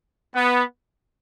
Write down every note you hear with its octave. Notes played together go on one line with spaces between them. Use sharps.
B3